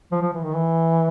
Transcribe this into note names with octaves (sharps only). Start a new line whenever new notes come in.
F3
F3
E3
D#3
E3